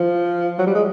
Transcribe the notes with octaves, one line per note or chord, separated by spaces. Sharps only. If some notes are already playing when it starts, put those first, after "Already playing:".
Already playing: F3
F#3
G3
G#3